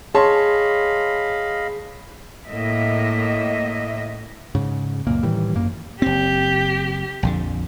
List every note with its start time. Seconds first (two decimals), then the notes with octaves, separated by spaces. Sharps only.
0.15 G#4 C#5 D#5 F5 A5 B5 C6
2.47 A2 A#3 D#5 E5
4.55 G#2 C#3
5.07 C#2 F#2 A#2 A#3
5.23 A2 D#3 E3 G3
5.54 G#1 F#2 A#3
6.02 F#1 C4 G4
7.23 A#1 F2 D3